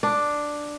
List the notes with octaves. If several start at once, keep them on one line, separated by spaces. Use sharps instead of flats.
D4